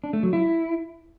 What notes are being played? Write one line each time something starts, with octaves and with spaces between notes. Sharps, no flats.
D4
A3
F#3
E4